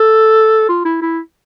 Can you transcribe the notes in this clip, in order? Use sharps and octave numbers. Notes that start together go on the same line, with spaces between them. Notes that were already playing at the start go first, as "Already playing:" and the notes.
Already playing: A4
F4
E4
E4